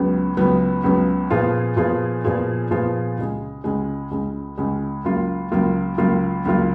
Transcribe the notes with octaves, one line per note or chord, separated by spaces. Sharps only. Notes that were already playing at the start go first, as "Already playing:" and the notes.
Already playing: C#2 C#3 F#3 B3
C#2 C#3 F#3 B3
C#2 C#3 F#3 B3
A#2 F3 B3 F4 G#4
A#2 F3 B3 F4 G#4
A#2 F3 B3 F4 G#4
A#2 F3 B3 F4 G#4
C#2 C#3 G#3
C#2 C#3 G#3
C#2 C#3 G#3
C#2 C#3 G#3
C#2 C#3 F#3 A#3 F4
C#2 C#3 F#3 A#3 F4
C#2 C#3 F#3 A#3 F4
C#2 C#3 F#3 A#3 F4